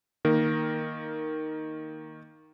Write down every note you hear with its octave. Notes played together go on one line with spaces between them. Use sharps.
D#3 A#3 A#4